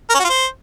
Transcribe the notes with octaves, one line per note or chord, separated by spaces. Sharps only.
A#4
C#4
F#4
F4
C5